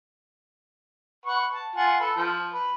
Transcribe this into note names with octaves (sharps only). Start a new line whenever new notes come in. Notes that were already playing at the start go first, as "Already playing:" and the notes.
B4 F#5 C#6
A5
F4 F#5 G#5
A4 B4
F3
B4